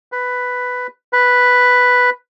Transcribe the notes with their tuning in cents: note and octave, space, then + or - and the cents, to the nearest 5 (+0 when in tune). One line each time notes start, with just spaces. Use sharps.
B4 +5
B4 +0